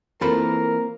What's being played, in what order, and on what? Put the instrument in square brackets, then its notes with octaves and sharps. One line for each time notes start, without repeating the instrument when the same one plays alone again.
[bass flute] E3 [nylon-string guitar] A#3 C4 C5 [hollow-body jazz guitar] F4 A4 B5 [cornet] A#4